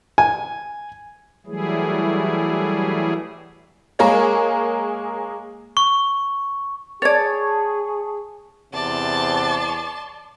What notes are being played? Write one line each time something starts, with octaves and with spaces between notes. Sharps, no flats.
G#5
E3 F#3 G3 A3 E4 G#4
G#3 A#3 G#4 A#4 C#5
C#6
G#4 C#5 D5 A5 C#6 G#6 A6
E2 C3 D5 A5 C6